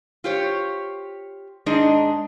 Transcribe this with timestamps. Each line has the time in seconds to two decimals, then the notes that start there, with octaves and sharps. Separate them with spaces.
0.24 F4 G4 C5 C#5
1.66 G#2 G#3 D4 D#4 G#4 D#5